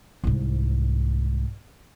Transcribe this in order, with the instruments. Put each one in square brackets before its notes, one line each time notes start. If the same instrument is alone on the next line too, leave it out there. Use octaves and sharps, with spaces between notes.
[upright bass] C2 G#2